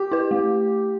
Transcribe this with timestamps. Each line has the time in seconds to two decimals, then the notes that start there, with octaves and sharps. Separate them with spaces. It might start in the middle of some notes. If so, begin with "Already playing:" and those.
Already playing: G4
0.12 E4 B4
0.31 A3